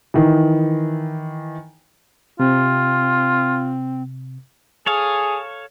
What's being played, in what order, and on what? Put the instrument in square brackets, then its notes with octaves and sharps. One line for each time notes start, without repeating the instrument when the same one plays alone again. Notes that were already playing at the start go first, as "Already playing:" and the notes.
[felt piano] D#3 E3
[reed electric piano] C3 [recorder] C4 [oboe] F4
[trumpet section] G#4 [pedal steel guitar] A4 C#5 F5